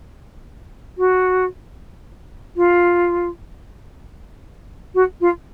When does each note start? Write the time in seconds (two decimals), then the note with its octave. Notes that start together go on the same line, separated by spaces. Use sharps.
0.97 F#4
2.56 F4
4.94 F#4
5.21 F4